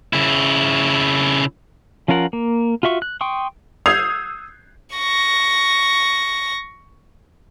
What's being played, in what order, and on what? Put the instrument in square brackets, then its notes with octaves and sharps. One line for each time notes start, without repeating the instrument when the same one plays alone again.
[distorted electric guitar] C#3 E4
[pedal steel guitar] F3 C#4 F4 A#4 F#5
A#3
F4 F#4 E5 C#6
F#6
G5 C6 C#6 D#6
[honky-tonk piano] D#6 E6 G6 G#6 C7 F7
[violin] C#6 A#6